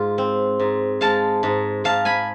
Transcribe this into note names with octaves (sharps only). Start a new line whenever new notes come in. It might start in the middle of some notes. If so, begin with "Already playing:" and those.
Already playing: G#2 F4
C4
G#2
G#3 F5 A5
G#2
G#2 F5 A5
G#5 B5